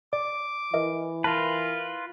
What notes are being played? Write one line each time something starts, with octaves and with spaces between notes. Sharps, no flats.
D5 D6
E3 A#4 D#5 E5
F4 A#4 B4 A5